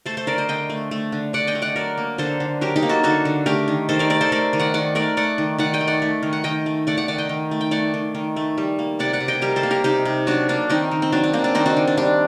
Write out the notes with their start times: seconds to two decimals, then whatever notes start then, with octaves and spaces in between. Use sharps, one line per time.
0.06 A3 A4 C5
0.17 A4 C5
0.27 D3 A#4 D5
0.38 C5 D#5
0.49 D3 D#5 G5
0.69 A3
0.91 A3
1.12 D3
1.33 D3 D5 F#5
1.47 D#5 G5
1.55 A3
1.62 D5 F#5
1.76 F#3 A#4 D5
1.97 A#3
2.18 D3 A4 C5
2.40 D3
2.61 F#3 G4 A#4
2.76 D#4 G4
2.82 A#3
2.89 F#4 A4
3.03 D3 F#4 A4
3.25 D3
3.46 A3 G4 A#4
3.68 D#3
3.89 D#3 A4 C5
3.99 A#4 D5
4.10 A3 A#4 D5
4.21 A4 C5
4.32 A3 A#4 D5
4.53 D#3
4.59 D5 F#5
4.74 D#3 D5 F#5
4.95 A3 A#4 D5
5.17 A3 D5 F#5
5.38 D#3
5.58 D#3 D5 F#5
5.74 D#5 G5
5.81 A3
5.87 D5 F#5
6.02 A3
6.23 D#3
6.33 F#5
6.44 D#3 D#5 G5
6.66 A3
6.87 A3 D5 F#5
6.97 D5 F#5
7.08 D#3 D5 F#5
7.18 D#5 G5
7.29 D#3
7.51 A3
7.61 G5
7.71 A3 D5 F#5
7.94 D#3
8.15 D#3
8.36 A3
8.57 G3
8.79 A#3
8.99 C3 D5 F#5
9.13 D5 F#5
9.20 C3
9.28 D#5 G5
9.42 G3 G4 A#4
9.56 A4 C5
9.63 A#3
9.71 G4 A#4
9.84 C3 D#4 G4
10.05 C3
10.27 F#3 D4 F#4
10.49 A#3 D4
10.70 D#3 C4 D#4
10.91 D#3
11.02 C4
11.12 F#3 D4
11.23 D4
11.33 A#3 C4
11.44 D4
11.55 D#3 C4 D#4
11.66 D4 F#4
11.77 D#3
11.87 D4
11.97 G3 D4